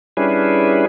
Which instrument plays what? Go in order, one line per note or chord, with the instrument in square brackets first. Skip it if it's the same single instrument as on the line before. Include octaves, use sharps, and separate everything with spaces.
[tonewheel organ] G3 C#4 D4 E4 G#4 B4